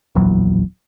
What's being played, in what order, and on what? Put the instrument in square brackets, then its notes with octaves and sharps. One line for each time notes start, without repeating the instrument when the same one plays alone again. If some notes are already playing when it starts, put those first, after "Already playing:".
[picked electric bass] D1 A#1 E2 F#3